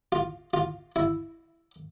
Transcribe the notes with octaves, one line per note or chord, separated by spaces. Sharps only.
F4
F4
E4